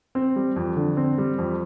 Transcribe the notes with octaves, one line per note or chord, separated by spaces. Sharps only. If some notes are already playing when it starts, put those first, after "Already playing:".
C4
G3
F2
D3
C4
G3
F2